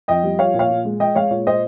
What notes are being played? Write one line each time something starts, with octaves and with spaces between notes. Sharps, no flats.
F2 D#5 G5
G3
F3 C#5 F5
A#2
C#5 F5
A#2
G#3
G#3 D#5 G5
G#3 C#5 F5
A#2 C#5
A#2 C5 D#5